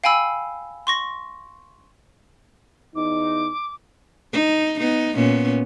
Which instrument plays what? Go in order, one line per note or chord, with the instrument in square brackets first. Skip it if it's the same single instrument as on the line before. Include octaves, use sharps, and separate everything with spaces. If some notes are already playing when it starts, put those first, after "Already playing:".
[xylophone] F5 G5 G#5 B5 E6
C6 C#6 A#6
[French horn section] E2 D#4 [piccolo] D6
[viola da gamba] D#4
B3 D#4
A#2 B3 C#4